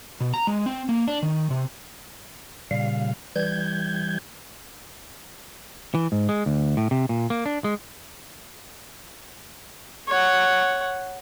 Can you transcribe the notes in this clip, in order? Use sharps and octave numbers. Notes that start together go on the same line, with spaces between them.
B2
A#5
G#3
C4
A#3
D4
D#3
C3
A#2 C#3 G3 F5
E3 G3 G6 G#6
E3
G#2
G#3
D2
A2
C3
A#2
A#3
D4
G#3
C#5 F#5